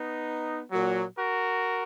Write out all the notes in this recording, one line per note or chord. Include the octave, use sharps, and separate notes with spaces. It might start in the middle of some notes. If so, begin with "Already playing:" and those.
Already playing: B3 D#4
A#2 F#3
F#4 A#4